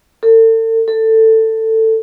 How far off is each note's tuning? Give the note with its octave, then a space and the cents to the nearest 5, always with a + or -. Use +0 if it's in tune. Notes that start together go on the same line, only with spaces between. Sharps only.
A4 +40
A4 +15